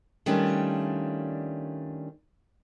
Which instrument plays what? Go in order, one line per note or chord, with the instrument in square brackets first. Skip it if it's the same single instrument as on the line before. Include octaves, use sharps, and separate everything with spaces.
[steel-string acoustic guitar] D#3 G3 A3 C#4 D4 F4